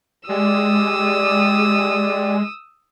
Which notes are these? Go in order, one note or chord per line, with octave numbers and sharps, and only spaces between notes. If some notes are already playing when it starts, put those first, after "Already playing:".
G#3 G4 D5 D#6 E6